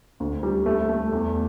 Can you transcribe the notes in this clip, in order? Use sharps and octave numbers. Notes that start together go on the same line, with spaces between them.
D2
G3
A3
A3
E2